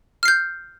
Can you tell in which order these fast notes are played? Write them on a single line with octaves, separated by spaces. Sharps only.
F6 C7 G6